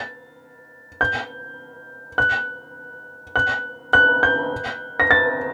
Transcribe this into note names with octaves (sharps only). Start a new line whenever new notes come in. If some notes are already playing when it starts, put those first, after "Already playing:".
Already playing: A6
G6
F#6
F#6
F#6
G6
A#6
A6